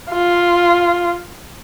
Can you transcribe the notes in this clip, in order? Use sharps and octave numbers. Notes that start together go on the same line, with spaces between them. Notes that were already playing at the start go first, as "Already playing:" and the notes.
F4